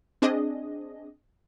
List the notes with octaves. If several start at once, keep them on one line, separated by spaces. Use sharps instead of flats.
C4 D4 G#4 D#5